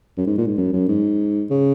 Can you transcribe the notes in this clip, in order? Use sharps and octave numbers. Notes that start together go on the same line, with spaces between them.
F#2
G#2
A#2
G#2
F#2
F#2
G#2
C#3